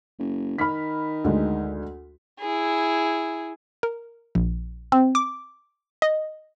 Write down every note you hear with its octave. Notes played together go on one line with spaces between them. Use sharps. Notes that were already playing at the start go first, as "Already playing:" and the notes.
F#1
D#3 B5 F6 B6
D2 G#3
E4 G#4
A#4
A#1
C4
D6
D#5